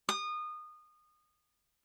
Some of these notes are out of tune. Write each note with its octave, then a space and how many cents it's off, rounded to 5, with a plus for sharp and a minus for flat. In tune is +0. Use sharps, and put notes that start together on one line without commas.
D#6 -25